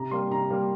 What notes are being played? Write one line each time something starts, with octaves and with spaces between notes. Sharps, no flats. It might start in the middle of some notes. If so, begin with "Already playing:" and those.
Already playing: C3 A#5
G3 A#3 C6
C3 A#5
G3 A#3